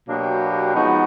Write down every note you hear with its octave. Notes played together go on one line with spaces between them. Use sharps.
B2 F#3 A#3 D4 G4
F3 G#3 B3 D#4 F#4